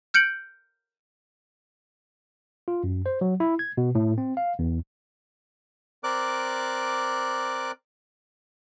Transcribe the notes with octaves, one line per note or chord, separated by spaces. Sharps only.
F6 G6 C#7 D7 F#7
F4
F#2
C5
F#3
E4
G#6
B2
A2
C4
F5
E2
C4 A#4 D5 D6 F#6